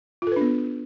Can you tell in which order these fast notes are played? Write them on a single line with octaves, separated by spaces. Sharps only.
F4 A4 B4 D4 B3